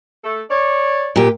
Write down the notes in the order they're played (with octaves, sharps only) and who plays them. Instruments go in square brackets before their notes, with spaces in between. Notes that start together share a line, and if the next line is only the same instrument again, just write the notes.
[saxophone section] A3 A4
C#5 D5
[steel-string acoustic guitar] A#2 G4